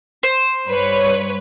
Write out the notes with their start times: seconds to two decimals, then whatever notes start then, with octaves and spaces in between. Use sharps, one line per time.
0.23 C5
0.68 G2 B4 C#5